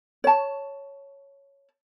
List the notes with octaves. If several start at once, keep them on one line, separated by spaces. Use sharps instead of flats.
C#5 A5